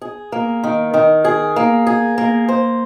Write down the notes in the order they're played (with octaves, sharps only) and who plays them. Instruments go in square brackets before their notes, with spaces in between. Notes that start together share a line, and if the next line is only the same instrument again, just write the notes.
[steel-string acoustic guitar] G#4
A#3
D#3
D#3
G#4
A#3
G#4
A#3
C5